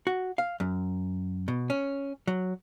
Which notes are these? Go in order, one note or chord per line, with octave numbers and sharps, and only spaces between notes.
F#4
F5
F#2
B2
C#4
F#3